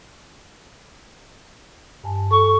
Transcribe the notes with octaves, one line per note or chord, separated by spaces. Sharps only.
G2 G#5 A5
A4 C#6